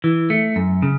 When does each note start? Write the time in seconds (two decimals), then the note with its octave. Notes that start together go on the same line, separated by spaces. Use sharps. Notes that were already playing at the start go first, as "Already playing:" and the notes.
0.04 E3
0.30 A3
0.56 F#2
0.82 C#3